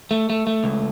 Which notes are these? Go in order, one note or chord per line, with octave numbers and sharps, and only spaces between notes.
A3
A3
A3
C#2